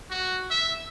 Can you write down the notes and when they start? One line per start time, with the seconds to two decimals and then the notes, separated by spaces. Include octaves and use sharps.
0.11 F#4
0.51 E5